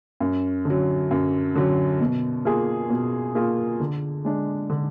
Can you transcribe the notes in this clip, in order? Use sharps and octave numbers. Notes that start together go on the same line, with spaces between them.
F#2
D3 F#3
F#2
D3 F#3
B2
A#3 F4 G#4
B2
A#3 F4 G#4
D3
G#3 D4
D3